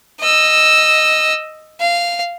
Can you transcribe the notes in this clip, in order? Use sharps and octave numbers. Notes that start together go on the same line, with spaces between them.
D#5 E6
F5